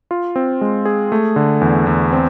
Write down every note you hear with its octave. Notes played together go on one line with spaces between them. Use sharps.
F4
C4
G#3
G#4
A3
D3
E2
E2
C4